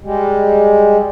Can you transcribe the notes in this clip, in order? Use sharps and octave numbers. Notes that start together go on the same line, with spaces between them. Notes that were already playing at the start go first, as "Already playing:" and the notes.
G3 G#3